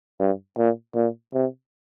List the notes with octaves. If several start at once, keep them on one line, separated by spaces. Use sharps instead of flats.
G2
A#2
A#2
C3